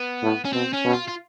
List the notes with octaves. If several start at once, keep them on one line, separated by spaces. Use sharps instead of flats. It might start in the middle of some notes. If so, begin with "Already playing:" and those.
Already playing: B3
A2
C#4
B2 C4
C#4
B2
F4
F4